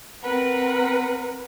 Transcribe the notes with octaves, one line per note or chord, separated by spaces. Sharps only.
C4 A#4 B4 F#5